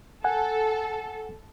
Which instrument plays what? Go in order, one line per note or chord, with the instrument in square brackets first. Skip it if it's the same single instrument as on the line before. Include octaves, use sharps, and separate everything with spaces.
[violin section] A4 [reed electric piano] F#5 G#5